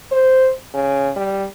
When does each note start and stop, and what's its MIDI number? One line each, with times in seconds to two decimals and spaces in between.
0.12 0.50 72
0.74 1.11 49
1.16 1.46 55